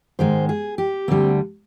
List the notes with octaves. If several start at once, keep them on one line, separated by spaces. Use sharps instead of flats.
G#2 D#3 G#3 C5
G#4
G4
D2 D3 G3 C4